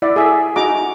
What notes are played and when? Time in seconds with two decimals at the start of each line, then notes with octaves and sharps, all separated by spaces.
0.02 E4 D5 E5 F#5
0.16 G#4 A4 E5
0.56 D#4 F#4 G#4 F#5 A#5 D6